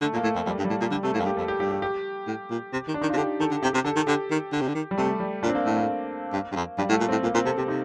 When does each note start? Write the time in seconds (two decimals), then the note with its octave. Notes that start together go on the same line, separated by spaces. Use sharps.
0.01 D3 A3
0.13 A#2
0.16 A#3
0.23 A2 A3
0.35 F2
0.46 F2 G3
0.58 G2
0.65 G3
0.69 A2 A3
0.81 A#2
0.91 D3 G3
1.03 C3 A3
1.14 A2 A#3
1.20 F2
1.25 G2 G4
1.37 F2 A4
1.48 G4
1.60 G2 G4
1.71 G4
1.82 G4
2.27 A2
2.50 A#2
2.73 C3
2.88 D#3
2.94 D4
3.01 D#3 D#4
3.09 F4
3.13 C3
3.17 D3 G4
3.40 D#3 A4
3.51 D3
3.63 C3 G4
3.73 C3 G4
3.85 D3 A4
3.96 D#3 A4
4.07 D3 G4
4.31 D#3
4.52 D3
4.61 C3
4.68 D3
4.75 D#3
4.91 G3
4.97 C3 A3
5.20 G3
5.43 A#2 D4
5.49 C4
5.55 A#3
5.65 A2 A3
5.76 A#3
6.33 G2
6.52 G2
6.56 F2
6.78 G2 G3
6.89 A2
6.93 A3
7.00 A#2
7.09 A2 C4
7.23 A#2 A#3
7.34 A#2 C4
7.45 C3 A4
7.58 C3 G4
7.68 C3 D#4